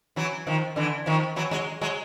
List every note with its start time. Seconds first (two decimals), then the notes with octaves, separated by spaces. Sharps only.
0.16 E3 F#3
0.47 D#3 F3
0.76 D3 E3
1.06 D#3 F3
1.36 E3 F#3
1.51 F#3 G#3
1.81 F#3 G#3